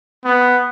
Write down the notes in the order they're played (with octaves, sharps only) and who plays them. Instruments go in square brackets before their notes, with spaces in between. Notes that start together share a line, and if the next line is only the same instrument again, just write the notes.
[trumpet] B3